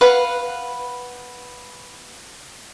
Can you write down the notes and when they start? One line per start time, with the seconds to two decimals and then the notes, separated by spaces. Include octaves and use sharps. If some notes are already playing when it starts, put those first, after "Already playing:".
0.01 B4 F5 F#5